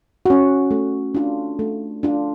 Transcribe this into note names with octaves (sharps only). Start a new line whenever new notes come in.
C#4 F#4
A3
D4 F4
A3
D4 F4